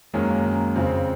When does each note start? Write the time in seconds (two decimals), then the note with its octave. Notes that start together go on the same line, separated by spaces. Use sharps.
0.14 F#2 D#3 G#3 A#3 C#4
0.30 A#3
0.46 A#3
0.76 F2 C#3 F3 C4